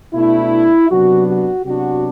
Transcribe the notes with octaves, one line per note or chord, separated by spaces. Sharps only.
B2 A3 D4 E4
C3 F#3 B3 D4 F#4
F#4
C3 F#3 B3 D4 F#4